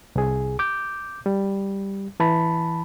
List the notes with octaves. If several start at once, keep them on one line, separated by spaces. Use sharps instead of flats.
C2 G#4
D6 G6
G3
E3 A5 B5